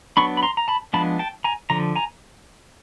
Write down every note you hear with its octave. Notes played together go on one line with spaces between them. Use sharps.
F#3 B3 D4 B5 C#6
B5
A#5 C6
A#5
A5 B5
F3 G#3 B3 D4 A5 B5
G5 A5
G#5 A#5
D3 F3 A#5
G#5 A#5